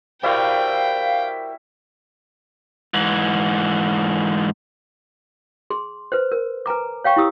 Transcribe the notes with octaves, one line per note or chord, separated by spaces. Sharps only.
G3 E4 F#4 A#4 C5 F5 G5
G#2 E3
G#4 C6
B4 C5
A#4
B4 G#5 A#5 D6
C#5 F5 G5 C#6
E4 G4 D#6 E6